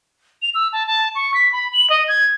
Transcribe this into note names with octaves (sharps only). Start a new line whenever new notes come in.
F7
E6
A5
A5
C#6
B6
B5
F#7
D#5
G#6